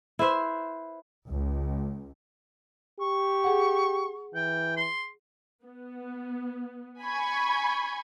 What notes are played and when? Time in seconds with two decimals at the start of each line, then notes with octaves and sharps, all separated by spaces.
0.19 E4 B4 C5 E5
1.28 C#2
3.00 G4 C#6
3.44 G#4 F#5
4.35 E3 G5
4.77 C6
5.64 B3
7.01 G#5 B5 C#6 G#6